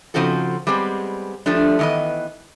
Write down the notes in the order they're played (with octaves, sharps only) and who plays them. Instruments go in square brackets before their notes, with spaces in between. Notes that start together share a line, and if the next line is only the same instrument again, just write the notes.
[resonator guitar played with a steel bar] C#3 F3 C4 D#4 F#4 A4
G3 G#3 B3 C4
F3 G3 A3 D4
D#3 E3 G#3 B3 D#5